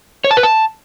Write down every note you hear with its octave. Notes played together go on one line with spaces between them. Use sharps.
C#5
A5
B4
A5